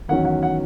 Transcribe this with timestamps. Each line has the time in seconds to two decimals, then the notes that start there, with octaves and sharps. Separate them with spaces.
0.08 E2 D#3 F#3 C#4 F#5
0.25 F#5
0.43 F#5